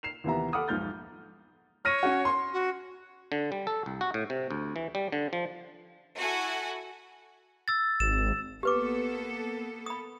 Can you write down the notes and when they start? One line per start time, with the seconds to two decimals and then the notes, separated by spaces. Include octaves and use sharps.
0.03 C7 E7 F7
0.24 D#2 C3 E3 B3 E5 A#5
0.53 A4 F#5 B5 D6 D#6 F6
0.68 B1 F2 G#2 F6 G6 A6
1.85 C#5 F6 A#6 D#7
2.03 C#4 F#4
2.25 C6
2.53 F#4
3.32 D3
3.52 G3
3.67 A4
3.86 C2
4.01 F#4
4.14 A2
4.30 C3
4.51 D2
4.76 E3
4.95 G3
5.12 D3
5.33 F3
6.19 E4 F#4 A4 F#5 G#5
7.68 E6 A6
8.00 G#1 E7
8.63 A#3 B3 G4 A4 B4 D6
9.86 B5 D#6